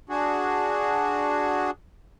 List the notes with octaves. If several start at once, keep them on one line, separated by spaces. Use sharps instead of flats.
D4 F#4 G#4